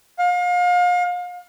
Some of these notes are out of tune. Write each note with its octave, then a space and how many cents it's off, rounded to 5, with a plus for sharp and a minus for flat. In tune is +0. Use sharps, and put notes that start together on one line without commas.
F5 +35